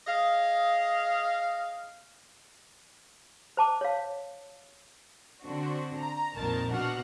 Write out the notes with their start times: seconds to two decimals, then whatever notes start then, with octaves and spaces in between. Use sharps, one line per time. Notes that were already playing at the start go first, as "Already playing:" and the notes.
0.07 G#4 D#5 F5
3.57 C5 A5 D6
3.81 C#5 F5
5.42 D3 C4 D4 F#4
5.98 A#5
6.36 A#1 F2 A#2 D#3 A#4 A5
6.70 B2 D4 F#4 F#5 F6